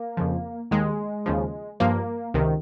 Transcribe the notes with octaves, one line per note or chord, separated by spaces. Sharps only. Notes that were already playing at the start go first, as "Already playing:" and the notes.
Already playing: A#3
F2 C#3 F3
D#2 D#3 G#3
D#2 C#3 F3
G2 F3 A#3
C#2 C3 D#3